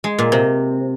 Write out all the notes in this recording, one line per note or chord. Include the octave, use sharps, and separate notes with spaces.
G#3
A#2
C3